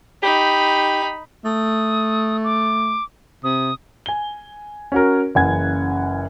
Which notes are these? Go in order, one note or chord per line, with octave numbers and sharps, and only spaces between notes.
D#4 G4 B5
A3 D#6
D6
C3 D#6
G#5 G7
C#4 F#4 A#4
F#1 C#3 E3 F#5 G#5 G#6